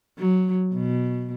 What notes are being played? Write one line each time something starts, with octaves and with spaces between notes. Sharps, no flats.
F#3
B2